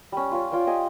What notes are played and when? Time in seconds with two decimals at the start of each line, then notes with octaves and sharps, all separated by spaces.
0.12 G3 C#4
0.32 C#4 F4
0.52 F4 C#5 D5 G5
0.66 G4 D#5 G#5